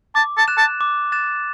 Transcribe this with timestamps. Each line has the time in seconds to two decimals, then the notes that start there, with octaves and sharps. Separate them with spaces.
0.15 A5 D6
0.37 A5
0.48 F#6 A6 E7
0.58 A5
0.81 D6
1.12 F#6 A6 E7